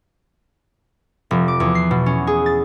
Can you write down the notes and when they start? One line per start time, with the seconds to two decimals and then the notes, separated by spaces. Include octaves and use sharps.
1.31 F1
1.48 D6
1.60 E2
1.75 C7
1.91 B2
2.06 C#4
2.27 G#4
2.46 A6